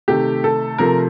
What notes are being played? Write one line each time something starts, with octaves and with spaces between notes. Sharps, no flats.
C3 D#3 A3 G4
A4
C3 F3 A3 A#4